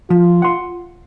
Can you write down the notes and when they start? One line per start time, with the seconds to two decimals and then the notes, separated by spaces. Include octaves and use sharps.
0.10 F3 F4
0.42 F#5 C6